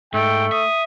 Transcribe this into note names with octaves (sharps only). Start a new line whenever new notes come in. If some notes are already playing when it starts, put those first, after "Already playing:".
G#2 A3 G5
E5 D#6